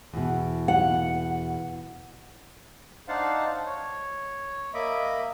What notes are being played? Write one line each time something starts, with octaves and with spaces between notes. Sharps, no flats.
E2 B2
F#5
D4 D#4 C5 F5 F#5 A5
C#5
A#3 D#5 E5 B5 D6